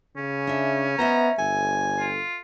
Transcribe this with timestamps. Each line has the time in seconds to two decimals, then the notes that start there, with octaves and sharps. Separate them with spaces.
0.17 C#3 C#4
0.47 D4 E5
0.99 B3 C5 D#5 E5 A#5
1.38 G1 A4 G#5
1.99 F4